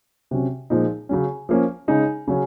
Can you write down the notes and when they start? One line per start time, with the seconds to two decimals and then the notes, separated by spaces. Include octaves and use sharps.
0.31 C3 F#3 C#4
0.70 A#2 F3 G#3 D#4
1.09 C#3 F#3 C#4
1.49 F3 A#3 C#4
1.88 C#3 G#3 D#4
2.28 C#3 F#3 C#4